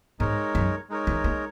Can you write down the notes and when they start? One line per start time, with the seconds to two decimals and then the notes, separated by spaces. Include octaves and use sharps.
0.19 G#2 G#3 D#4 A#4 C#5
0.55 F#2
0.89 G#3 D#4 A#4 C#5
1.07 E3
1.24 A#3